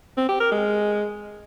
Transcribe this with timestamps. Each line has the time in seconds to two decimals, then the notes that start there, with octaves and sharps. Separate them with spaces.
0.17 C4
0.29 G4
0.40 A#4
0.52 G#3